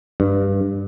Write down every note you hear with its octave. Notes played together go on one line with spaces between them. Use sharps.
G2